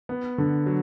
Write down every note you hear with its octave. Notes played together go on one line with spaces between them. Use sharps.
B3
D3
F#3